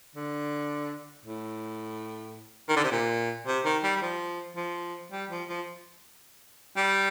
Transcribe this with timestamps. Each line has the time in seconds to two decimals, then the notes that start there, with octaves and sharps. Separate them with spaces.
0.16 D3
1.26 A2
2.69 D#3
2.76 D3
2.84 C3
2.92 A#2
3.47 C3
3.65 D#3
3.83 G3
3.96 G3
4.02 F3
4.56 F3
5.12 G3
5.31 F3
5.49 F3
6.77 G3